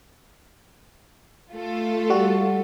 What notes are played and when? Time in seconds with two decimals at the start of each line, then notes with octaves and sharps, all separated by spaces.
1.52 A3 F4 A4
2.10 G3 F#4